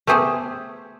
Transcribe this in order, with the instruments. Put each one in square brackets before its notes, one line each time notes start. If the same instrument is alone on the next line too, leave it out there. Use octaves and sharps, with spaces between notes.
[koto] A3 B3 G4 G#4 C5